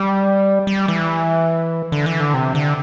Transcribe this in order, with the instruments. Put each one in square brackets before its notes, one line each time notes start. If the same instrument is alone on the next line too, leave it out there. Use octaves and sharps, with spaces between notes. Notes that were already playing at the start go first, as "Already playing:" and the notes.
Already playing: [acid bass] G3
G3
E3
D3
E3
D3
C3
D3